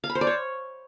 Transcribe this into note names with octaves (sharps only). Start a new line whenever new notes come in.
F5
B5
C5
D5
C#5